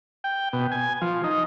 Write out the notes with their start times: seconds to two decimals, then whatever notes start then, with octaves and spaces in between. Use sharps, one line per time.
0.24 G5
0.53 B2
0.72 G#5
1.01 F3
1.24 D#4